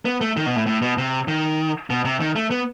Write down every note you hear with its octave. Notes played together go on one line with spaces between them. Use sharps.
B3
A3
D#3
B2
A2
A2
B2
C3
D#3
B2
C3
D#3
A3
B3